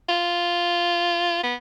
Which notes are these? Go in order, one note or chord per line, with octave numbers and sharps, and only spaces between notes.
F4
B3